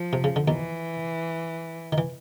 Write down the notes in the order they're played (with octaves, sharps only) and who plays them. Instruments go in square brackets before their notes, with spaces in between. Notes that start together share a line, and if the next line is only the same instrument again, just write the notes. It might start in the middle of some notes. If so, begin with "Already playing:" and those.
Already playing: [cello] F3
[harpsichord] C3
C#3
D3
[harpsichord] D#2 D#3 [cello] E3
[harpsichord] D#3
E3